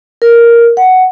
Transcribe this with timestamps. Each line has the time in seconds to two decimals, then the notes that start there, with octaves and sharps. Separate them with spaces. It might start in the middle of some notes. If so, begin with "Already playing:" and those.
0.22 A#4
0.77 F#5